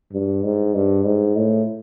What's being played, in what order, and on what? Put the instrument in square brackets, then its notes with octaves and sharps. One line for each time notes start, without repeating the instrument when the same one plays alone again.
[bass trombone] G2
G#2
G2
G#2
A2